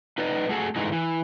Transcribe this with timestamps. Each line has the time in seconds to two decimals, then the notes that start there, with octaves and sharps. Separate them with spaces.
0.18 D#4 B4 D5 D#5
0.49 A3 F#4 G#4 A4
0.76 G#2 D3 E3 G#3 A3 D#4
0.92 E3